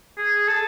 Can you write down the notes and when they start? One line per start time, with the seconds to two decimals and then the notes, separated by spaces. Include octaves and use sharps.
0.17 G#4
0.47 A4